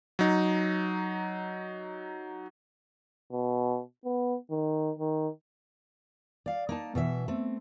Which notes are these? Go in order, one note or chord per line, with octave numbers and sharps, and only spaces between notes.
F#3 D#4
B2
B3
D#3
D#3
D5 F5
A#3 D#4 A5
B2 E3 E5
A3 C4